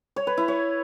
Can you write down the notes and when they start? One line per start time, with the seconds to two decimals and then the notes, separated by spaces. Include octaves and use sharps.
0.16 C#5
0.27 B4
0.38 E4
0.48 C#5